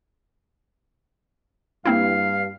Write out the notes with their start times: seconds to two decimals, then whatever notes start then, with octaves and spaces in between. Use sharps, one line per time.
1.85 G2 A#3 C4 E4 F5